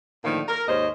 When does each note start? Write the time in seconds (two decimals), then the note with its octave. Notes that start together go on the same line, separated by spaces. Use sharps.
0.24 A2 D3 D#3 F3 A#3
0.49 A#4
0.68 D#2 G#2 C5 C#5 D#5